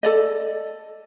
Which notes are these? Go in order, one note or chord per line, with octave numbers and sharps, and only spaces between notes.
A4 D5 D#5